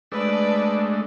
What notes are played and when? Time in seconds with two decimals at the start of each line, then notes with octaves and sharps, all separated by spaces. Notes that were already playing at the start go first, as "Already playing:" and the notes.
0.12 G#3 A3 D4 B4 D5